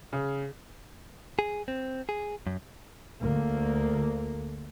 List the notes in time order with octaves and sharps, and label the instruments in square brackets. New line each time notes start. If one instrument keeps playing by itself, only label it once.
[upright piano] C#3
[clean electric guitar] G#4
C4
G#4
F#2
[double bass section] D2 A#3